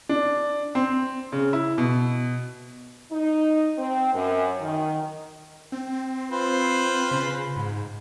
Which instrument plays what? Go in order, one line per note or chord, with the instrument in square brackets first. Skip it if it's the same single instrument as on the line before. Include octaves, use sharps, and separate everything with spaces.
[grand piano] D4
C4
C#3
E4
B2
[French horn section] D#4
C4
F#2
D#3
[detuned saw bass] C4
[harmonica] F4 B4 C5
[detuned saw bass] C#3
G#2